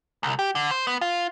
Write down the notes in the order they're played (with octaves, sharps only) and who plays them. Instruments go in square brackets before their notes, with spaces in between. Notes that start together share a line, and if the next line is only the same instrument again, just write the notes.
[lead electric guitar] C2
G4
D3
C5
B3
F4